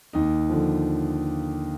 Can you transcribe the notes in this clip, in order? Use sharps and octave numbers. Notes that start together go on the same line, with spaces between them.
D#2 D#4
D3 F3